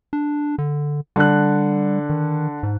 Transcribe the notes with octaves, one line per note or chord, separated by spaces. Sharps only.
D4
D3
D3 G3 F#6
D#3
G#2